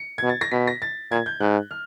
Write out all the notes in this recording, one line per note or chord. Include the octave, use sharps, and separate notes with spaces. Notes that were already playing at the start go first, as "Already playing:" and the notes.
Already playing: C#7
B2 G#6
A6
A#6
B2 B6
A#6
A6
A#2 G#6
G6
G#2 F#6
F6